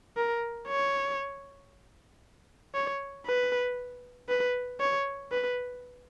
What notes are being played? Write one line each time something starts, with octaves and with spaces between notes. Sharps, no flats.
A#4
C#5
C#5
B4
B4
C#5
B4